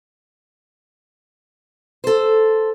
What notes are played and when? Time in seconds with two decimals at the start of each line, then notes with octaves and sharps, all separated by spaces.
2.04 A4 C5